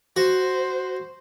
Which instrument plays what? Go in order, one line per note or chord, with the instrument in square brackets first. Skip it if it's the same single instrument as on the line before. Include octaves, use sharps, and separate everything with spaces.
[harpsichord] F#4 [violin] C5